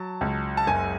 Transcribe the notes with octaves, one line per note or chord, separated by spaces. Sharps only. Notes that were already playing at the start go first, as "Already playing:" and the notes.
Already playing: F#3 A5
C#2
A5
F#1 G#5